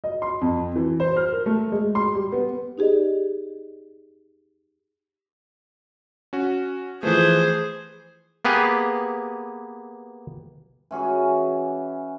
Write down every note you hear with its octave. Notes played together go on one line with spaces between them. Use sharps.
D#5
C6
F2
E3
C5
F6
A#4
A3
G#3
C6
G3
B3
D#4 G4 G#4 D5 D#5
C#4 F#4
E3 F3 A3 G#4 C5
A#3 B3 G4 G#4 B4
E3 C#4 F#4 G#4